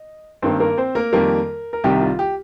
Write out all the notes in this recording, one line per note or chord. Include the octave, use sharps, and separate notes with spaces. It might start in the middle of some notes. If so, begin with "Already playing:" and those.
Already playing: D#5
G2 D#3 A#3 C4 C5
A#3 A#4
C4 C5
A#3 A#4
F2 D#3 G3 A#3
A#4
C2 C3 D#3 G3 G4
F4
G4